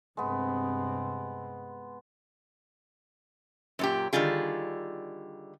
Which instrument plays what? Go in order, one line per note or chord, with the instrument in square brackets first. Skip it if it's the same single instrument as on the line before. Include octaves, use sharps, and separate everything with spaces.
[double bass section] G2 C3 C4 [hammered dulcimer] G#3 B3
[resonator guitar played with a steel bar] F#2 A#2 G4
D3 D#3 G3 F4 G#4